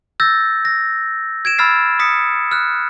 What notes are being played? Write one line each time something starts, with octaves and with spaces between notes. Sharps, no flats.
E6 G6 A6 A#6
A#6
G#6 D7 E7
B5 E6 F6 A6 C7
D#6 B6 C#7
F6 F#6